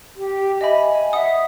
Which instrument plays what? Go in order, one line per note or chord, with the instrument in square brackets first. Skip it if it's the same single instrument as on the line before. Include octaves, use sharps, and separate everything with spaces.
[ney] G4
[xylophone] D#5 E5 B5 [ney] G#5
[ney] E5 [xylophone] F#5 D#6